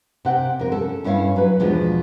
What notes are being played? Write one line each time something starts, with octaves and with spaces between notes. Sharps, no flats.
C3 F#5 G5
F2 A#4
C#4 A4
G2 C#4 E4 C#5 F5
F#3 B4
E2 B2 F3 G#3 D4